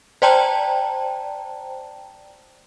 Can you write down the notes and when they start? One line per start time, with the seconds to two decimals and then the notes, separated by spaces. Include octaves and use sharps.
0.22 C5 D5 G5 A5 A#5